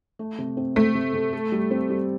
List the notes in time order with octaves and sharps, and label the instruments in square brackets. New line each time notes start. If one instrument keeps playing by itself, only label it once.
[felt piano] A3
C3
C4
[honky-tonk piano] A3 [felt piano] C4
[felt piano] C3
C3
A4
G3
C4
G3